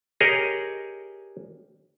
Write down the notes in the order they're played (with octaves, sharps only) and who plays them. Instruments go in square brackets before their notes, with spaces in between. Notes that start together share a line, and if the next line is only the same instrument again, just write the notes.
[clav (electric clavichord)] G4 G#4 A#4 C#5 D#5